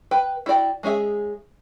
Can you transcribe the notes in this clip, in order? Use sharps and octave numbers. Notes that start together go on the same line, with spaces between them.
B4 G5
E4 F#4 D5 G5
G#3 C#4 G#4 E5